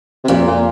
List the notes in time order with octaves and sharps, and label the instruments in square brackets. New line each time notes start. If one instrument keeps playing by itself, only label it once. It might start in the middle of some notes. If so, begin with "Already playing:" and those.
[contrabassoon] C3
[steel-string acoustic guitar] F2 [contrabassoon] A#2
[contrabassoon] A#2